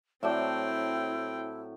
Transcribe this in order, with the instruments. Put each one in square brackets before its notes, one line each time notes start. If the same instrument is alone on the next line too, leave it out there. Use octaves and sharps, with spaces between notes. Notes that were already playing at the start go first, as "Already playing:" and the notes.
[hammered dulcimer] A2 F#3 A5 [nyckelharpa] C4 G5 [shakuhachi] E4 [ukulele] D5 E5